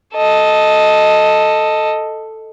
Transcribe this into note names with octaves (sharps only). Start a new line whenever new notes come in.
A4 D#5